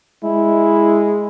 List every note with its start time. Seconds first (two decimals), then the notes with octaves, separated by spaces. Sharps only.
0.23 G#3 E4